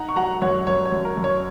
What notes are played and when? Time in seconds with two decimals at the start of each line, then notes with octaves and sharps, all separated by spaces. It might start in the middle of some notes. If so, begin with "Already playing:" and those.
Already playing: D#4 F#5 A#5
0.09 C#6
0.16 F#3 F#5 A#5
0.42 F#2 C#5 F#5
0.67 F#2 C#5
0.85 C#5
0.92 F#2
1.05 A#4
1.17 F#2
1.24 C#5